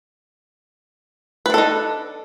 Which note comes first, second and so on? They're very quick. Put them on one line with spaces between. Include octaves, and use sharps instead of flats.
B4 D4 A4 D#4